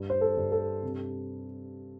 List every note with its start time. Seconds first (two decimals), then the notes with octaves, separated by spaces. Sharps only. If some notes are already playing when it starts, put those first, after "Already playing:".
Already playing: G2
0.10 C5
0.21 A4
0.37 G2
0.52 A4
0.82 C3